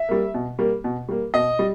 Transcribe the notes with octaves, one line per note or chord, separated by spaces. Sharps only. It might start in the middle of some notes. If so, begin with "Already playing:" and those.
Already playing: E5
G3 A#3
B2
G3 A#3
B2
G3 A#3
B2 D#5
G3